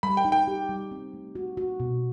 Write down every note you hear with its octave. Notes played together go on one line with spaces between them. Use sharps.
G3 B5
G5
D#4
G5
G4
G3
C4
A3
F#4
F#4
B2